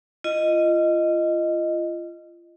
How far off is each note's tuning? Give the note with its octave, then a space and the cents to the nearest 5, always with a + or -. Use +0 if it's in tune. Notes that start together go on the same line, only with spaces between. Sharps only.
F4 -30 D#5 -5